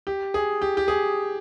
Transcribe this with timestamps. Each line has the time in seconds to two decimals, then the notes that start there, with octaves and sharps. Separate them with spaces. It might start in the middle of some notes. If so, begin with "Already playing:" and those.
0.07 G4
0.34 G#4
0.62 G4
0.77 G4
0.88 G#4